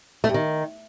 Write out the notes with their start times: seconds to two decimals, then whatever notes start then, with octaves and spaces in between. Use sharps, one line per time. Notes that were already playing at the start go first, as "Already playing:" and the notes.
0.24 A3
0.29 G2
0.34 D#3